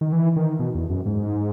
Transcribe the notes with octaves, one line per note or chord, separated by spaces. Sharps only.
D#3
E3
D#3
B2
E2
F#2
G#2